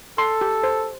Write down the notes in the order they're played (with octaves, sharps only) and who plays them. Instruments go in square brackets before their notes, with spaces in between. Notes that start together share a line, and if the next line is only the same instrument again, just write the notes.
[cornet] A4 [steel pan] C6
[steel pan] G4
C5